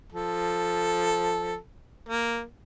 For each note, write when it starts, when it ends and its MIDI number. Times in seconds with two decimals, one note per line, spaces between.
0.12 1.56 53
0.12 1.56 69
2.09 2.43 58